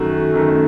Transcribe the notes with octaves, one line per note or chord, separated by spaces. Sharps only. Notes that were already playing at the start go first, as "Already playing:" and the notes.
Already playing: F#2 D#3 A3 F#4
F#2 D#3 A3